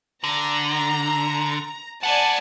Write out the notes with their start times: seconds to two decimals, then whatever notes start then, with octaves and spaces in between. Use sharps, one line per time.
0.24 D3 A#5
2.03 C5 D5 F#5 G#5 A5